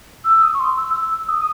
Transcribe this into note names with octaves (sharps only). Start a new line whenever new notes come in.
E6
D#6
C#6
C6
E6
E6
D#6